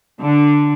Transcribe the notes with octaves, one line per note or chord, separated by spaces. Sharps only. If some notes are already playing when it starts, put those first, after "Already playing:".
D3